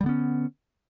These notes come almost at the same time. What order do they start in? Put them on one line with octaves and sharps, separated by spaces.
G3 D3 B3 C#4